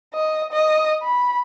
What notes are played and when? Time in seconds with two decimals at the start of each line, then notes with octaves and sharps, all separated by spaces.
0.14 D#5
0.53 D#5
1.03 B5